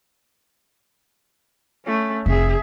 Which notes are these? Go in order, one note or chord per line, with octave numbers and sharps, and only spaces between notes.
A3 C#4
F1 G#4 E5